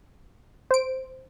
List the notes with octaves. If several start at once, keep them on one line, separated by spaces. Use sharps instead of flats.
C5 D7